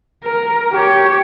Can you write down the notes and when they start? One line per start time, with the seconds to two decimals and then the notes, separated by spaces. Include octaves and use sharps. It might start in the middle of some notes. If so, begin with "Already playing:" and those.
0.24 A#4
0.73 G4 C#5